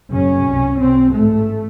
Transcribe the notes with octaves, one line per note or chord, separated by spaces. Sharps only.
F#1 F#2 C#3 C#4
C2 C3
C2 C3 C4
A1 G#2 A3